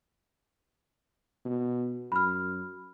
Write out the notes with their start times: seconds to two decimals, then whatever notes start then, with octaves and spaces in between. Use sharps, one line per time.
1.45 B2
2.12 F#2 B5 F6